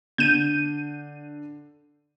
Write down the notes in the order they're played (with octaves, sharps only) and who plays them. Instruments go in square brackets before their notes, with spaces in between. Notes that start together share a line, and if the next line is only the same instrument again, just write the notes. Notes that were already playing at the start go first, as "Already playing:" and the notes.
[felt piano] D3 [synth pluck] G6 D#7